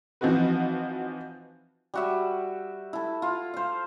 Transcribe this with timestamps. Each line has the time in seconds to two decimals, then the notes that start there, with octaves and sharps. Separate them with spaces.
0.21 E3 F3 C4 D#4 F#4 B4
1.94 G3 F#4 E5
2.93 E4 A4
3.22 F4
3.54 C5 F5